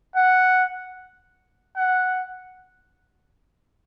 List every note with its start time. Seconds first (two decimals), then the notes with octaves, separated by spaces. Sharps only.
0.15 F#5
1.76 F#5